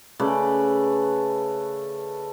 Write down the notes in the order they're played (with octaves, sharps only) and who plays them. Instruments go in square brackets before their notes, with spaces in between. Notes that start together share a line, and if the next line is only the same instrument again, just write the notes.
[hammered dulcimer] C#3 A3 B4 D5